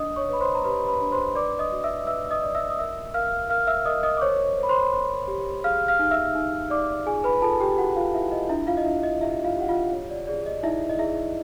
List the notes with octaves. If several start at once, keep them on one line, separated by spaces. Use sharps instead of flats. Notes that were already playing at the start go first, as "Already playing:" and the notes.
Already playing: D4 D#5 D#6
C#5 C#6
B4 B5
C5 C6
A#5
G4 B4 B5
B4 B5
D4
C5 C6
B4 D5 D6
D#5 D#6
F#4
E5 E6
B4 E5 E6
D#5 D#6
D5
E5 E6
D#6
A#4 E5 E6
A#4 F5 F6
A#4 F5 F6
E5 E6
A#4 D#5 D#6
D#5 D#6
D6
C5 C#5 C#6
C5
B5
C5 C6
C5
G4
G#4 F5 F6
F5 F6
D#4
E5 E6
D#4
D#4 D5 D6
F4 G#4 G#5
B4 B5
F4 A4 A5
G4 G5
F4 F#4 F#5
F4 F5
E4 F4 E5
D#5
D4 E4 E5
F4 F5
D#5
D4 E4 E5
D#5
E4 G4 E5
F4 F5
G4 F#5
F4 F5
C#5
D5
G#4 D5
D#5
D#4 E4 E5
D#5
E4 G#4 E5